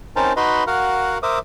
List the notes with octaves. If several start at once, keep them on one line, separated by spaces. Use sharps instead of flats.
C4 C#4 D#4 A#4 C5 A5
D#4 F#4 B4 D#5 B5 C6
F#4 A#4 F5 F#5
A#4 C5 E5 D6 D#6